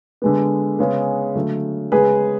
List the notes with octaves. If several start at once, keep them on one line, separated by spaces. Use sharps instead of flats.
D3 G#3 B3
C#3 G#3 B3
D3 F#3 A3
C#3 G#3 B3 G#4 B4